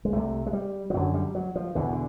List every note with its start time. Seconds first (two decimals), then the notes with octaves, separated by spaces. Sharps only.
0.05 G#3
0.12 C2 C3 A3
0.46 G#3
0.53 G3
0.90 F3
0.94 F#2 D3 F#3
1.14 G3
1.35 F#3
1.56 F3
1.75 E2 B2 D3
1.93 D3